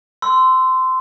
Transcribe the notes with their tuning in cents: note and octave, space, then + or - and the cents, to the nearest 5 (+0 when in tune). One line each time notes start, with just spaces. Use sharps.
C6 -20 E6 +0